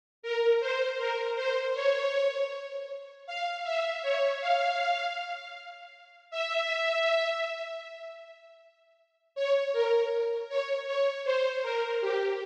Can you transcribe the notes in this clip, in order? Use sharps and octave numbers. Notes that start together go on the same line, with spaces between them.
A#4
C5
A#4
C5
C#5
F5
E5
C#5
F5
E5
C#5
A#4
C#5
C#5
C5
A#4
G4